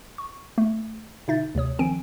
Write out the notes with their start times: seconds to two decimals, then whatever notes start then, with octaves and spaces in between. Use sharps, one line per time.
0.18 C#6
0.58 A3
1.28 B2 D3 D#4 E5 G6 A6
1.55 D2 C3 C#5 D#6
1.79 D#3 F3 C4 G#5 D7